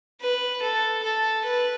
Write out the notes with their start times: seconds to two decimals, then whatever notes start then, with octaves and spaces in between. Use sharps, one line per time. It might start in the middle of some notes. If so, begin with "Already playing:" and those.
0.21 B4
0.62 A4
1.03 A4
1.45 B4